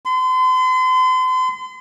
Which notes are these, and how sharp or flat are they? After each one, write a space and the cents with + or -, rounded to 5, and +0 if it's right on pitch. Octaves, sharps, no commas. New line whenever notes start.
C6 -40